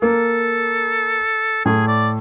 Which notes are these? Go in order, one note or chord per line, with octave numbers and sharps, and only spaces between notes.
A#3 A4
A2 G#4
D5